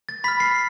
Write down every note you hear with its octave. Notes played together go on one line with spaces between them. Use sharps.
A6
B5 F6 B6
C7